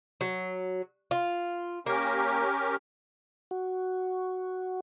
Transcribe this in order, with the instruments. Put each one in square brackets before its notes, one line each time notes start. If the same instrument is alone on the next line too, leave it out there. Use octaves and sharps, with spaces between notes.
[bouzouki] F#3
F4
[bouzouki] A#3 [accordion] C#4 G4 A#4
[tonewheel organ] F#4